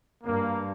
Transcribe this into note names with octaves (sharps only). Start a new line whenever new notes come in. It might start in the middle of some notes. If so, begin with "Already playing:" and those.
G2 A#3